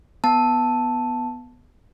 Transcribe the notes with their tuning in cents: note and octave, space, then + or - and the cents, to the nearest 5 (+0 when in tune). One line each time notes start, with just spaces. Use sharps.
B3 +0 A5 +0